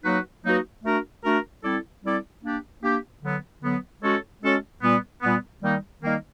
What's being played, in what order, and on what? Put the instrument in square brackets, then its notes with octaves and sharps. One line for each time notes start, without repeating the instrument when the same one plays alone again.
[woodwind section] F#3 A#3 D#4 F#4 B4
F#3 A#3 D#4 F#4 B4
A3 D4 F#4 A#4
A3 D4 F#4 A#4
G3 C4 E4 A4 D5
G3 C4 E4 A4 D5
A#3 D4 G4
A#3 D4 G4
D3 F#3 B3
D3 F#3 B3
G#3 C#4 F#4 A4 C#5
G#3 C#4 F#4 A4 C#5
A#2 G3 B3
A#2 G3 B3
D#3 G3 A#3 D#4
D#3 G3 A#3 D#4